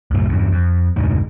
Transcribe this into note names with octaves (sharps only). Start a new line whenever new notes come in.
C2 F#2 A2
E2 G2
F2
F1 D2 G#2